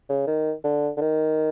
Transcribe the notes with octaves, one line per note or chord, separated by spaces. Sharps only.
C#3
D#3
D3
D3
D#3